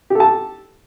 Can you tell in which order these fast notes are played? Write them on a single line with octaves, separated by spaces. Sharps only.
G4 A4 A5